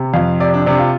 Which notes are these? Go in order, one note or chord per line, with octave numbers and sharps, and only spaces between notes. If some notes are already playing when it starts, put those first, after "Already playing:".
Already playing: C3
F2 F5
C3 D5
D4
C3 D4
F4